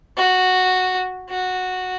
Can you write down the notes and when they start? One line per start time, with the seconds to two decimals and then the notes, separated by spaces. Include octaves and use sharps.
0.17 F#4
1.30 F#4